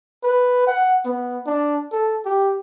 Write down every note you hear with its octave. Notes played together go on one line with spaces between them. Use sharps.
B4
F#5
B3
D4
A4
G4